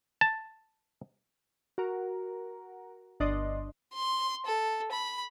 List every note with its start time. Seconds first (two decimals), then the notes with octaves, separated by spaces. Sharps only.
0.21 A5
1.78 F#4 A#4
3.20 G1 D4 D#5 C6
3.94 C6
4.46 A4
4.92 B5